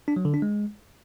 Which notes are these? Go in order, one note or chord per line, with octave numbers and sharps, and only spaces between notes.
D4
F#3
D3
D4
G#3